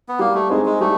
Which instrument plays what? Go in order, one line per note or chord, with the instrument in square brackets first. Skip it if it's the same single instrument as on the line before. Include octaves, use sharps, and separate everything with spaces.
[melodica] B3
[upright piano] G3 [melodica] A#3
[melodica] A3
[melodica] G#3 [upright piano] C4 D#4 G#4
[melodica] G#3
[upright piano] G3 [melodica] A3